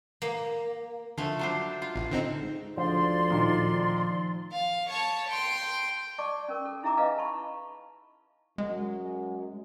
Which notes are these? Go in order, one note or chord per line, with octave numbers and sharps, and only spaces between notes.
A#3
D3 F3 A3
F#3 D4 C5
F4
A1
D3 C4 D#4
G#2
D2 F3 D5 C6
A#2 D#3
F5
C#5 A5
G5 C6
D5 A5 C#6 D6
C#4 A#4
A4
D#4 E4 G#4 E5 A#5 D6
B4 D#5 F5 G#5 A#5
A5 B5 C#6
F#2 G#3